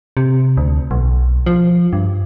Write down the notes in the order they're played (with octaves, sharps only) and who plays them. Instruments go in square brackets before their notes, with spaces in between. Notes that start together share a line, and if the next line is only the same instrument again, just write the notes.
[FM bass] C3
D2
B1
F3
G2